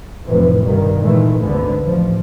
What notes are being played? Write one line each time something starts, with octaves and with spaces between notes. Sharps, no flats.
F1 A2 C3 E3
C2 G2 B2 D#3
A#2 D#3 E3 G#3 A3
G#1 D2 D3 B3
A1 F3